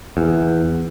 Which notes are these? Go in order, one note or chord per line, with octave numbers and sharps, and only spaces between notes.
E2